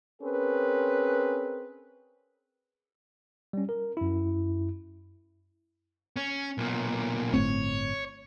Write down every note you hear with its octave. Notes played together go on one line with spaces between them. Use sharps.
C4 C#4 G#4 A#4 B4
G3 C#4
A#4
F#2 E4
C#4
B1 A#2
G1 A2 C4 C#5